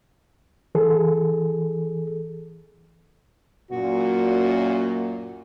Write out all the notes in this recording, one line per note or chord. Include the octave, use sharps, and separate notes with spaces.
E3 G#4 A4
F#2 A#2 F#4